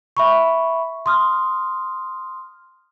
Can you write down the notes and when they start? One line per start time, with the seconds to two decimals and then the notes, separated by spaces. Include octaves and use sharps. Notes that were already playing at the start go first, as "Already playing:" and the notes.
0.17 E5 B5 C#6
1.06 C6 D#6 F6